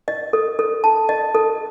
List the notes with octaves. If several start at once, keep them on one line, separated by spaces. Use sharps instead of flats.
D#5
A4
A4
A5
D#5
A4